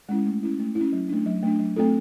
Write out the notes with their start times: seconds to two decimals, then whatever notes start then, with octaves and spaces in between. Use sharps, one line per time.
0.09 G#3 C#4 E4
0.26 A3
0.43 C#4 E4
0.60 A3
0.75 E4
0.81 C#4
0.93 F#3
1.09 A3 D4
1.26 F#3
1.43 A3 D4
1.59 F#3
1.76 A3 C4 F4 A4